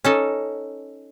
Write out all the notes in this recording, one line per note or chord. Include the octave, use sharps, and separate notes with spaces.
C#4 D#4 A4